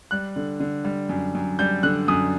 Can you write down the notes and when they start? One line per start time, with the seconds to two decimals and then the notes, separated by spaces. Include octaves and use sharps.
0.11 G3 F#6
0.36 D3
0.60 D3
0.85 G3
1.09 F#2
1.35 F#2
1.59 G3 G6
1.83 D3 F#6
2.08 F#2 D#6